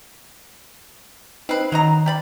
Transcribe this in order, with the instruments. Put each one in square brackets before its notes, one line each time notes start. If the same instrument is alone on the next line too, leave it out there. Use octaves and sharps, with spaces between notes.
[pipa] C4 B4 [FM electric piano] D#4 D#5 C7
[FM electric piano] D#3 [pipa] F#3 D#4 A#5
[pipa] G4 D5 B5